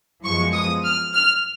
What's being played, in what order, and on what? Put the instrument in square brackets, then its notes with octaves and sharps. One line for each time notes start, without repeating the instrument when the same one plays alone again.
[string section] F#2 F3 G#3 B3 C#6
D#6
F6
F6